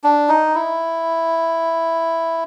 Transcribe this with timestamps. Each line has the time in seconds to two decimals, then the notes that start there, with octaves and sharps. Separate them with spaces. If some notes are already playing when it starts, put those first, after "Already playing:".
0.04 D4
0.29 D#4
0.55 E4